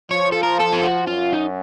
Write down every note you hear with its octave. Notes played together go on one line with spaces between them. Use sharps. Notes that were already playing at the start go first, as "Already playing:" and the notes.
F3 C#5
A4
A#4
A4
F4
F#4
F#2 F4
D#4